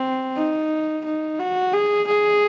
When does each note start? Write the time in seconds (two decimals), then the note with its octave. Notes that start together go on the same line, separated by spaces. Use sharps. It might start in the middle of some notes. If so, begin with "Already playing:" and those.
Already playing: C4
0.36 D#4
1.05 D#4
1.39 F#4
1.73 G#4
2.07 G#4